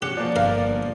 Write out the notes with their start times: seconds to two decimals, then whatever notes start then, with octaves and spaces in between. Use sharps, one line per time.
0.02 C#4 D4 F#4 G4 F#6 C#7
0.17 F3 A#3 D5
0.36 G1 A#4 F5